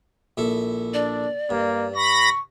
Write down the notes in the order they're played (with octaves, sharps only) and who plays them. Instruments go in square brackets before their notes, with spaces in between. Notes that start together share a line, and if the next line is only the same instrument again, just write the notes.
[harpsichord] A#1 E4 A4
[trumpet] D4 [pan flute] D5
[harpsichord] G2 [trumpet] A#3
[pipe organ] B5 A#6 [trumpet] C#6